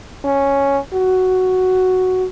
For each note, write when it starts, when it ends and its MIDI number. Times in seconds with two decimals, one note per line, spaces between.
0.25 0.78 61
0.94 2.26 66